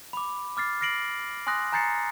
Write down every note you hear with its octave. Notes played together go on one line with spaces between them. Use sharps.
B5 D6
D6 F6 A6 C7
F6 A#6 C7 D7 F#7
G#5 C6 D#6 F#6 A#6
G#5 A#5 G6 A6 C7 C#7